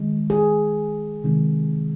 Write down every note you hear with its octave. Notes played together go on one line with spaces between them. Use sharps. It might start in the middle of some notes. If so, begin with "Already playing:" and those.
Already playing: D#3 G#3
G#4
C3 D#3 G#3